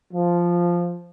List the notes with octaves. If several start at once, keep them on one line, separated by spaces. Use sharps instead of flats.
F3